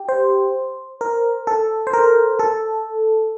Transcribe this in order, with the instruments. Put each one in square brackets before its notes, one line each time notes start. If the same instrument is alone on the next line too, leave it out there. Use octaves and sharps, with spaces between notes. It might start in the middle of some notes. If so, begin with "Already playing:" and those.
Already playing: [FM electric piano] G4
C5
A#4
A4
C5
A#4
A4